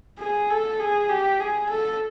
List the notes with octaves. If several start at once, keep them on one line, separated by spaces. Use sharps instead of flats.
G#4
A4
G#4
G4
G#4
A4